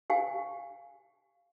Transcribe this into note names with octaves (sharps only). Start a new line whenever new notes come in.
G4 F5 G#5